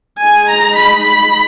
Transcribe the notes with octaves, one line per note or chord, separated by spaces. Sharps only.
G#3 D#4 G#5
A#5
B5
B5